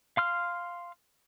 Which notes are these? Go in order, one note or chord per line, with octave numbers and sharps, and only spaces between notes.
F5 C6 F6